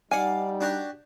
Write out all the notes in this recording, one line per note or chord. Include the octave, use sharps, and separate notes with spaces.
G3 D#4 D5 F5 F#5 G#5
D4 F#4 G4